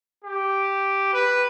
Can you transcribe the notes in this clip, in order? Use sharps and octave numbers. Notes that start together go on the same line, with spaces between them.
G4
B4